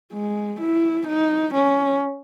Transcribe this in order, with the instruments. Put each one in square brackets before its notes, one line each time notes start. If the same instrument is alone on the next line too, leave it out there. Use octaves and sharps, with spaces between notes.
[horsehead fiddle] G#3
E4
D#4
C#4